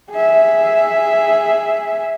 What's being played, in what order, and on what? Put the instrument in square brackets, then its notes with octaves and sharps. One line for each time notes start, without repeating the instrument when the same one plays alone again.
[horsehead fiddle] G#4 E5